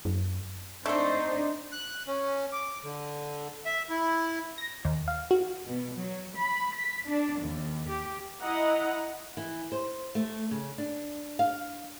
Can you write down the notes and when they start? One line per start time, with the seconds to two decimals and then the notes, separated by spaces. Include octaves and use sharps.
0.05 F#2
0.86 A3 C4 D4 D#4 C5
1.72 F#6
2.07 C#4
2.52 D6
2.84 D3
3.65 E5
3.90 E4
4.58 A#6
4.85 D#2
5.08 F5
5.31 F#4
5.65 B2
5.97 F#3
6.36 B5
6.75 B6
7.07 D4
7.40 D#2
7.89 G4
8.43 E4 D#5 F#5 A#5
9.37 E3
9.72 C5
10.15 A3
10.51 C#3
10.78 D4
11.39 F5